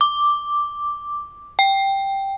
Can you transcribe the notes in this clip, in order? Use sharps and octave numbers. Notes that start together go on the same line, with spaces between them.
D6
G5